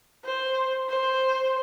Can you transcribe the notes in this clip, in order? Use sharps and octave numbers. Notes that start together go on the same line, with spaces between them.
C5
C5